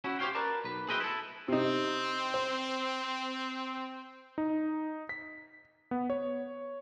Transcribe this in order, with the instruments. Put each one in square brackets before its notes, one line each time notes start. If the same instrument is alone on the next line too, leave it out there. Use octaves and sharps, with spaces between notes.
[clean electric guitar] C#4 E4 F#4
G4 C5 C#5 F5 G5
A#4 B4 D5 A5
B1 B4
G#4 B4 C5 D#5 E5 G5
E4 A4
[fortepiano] C3 D#4 [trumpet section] C4
[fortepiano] C5
[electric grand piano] D#4
B6
B3
C#5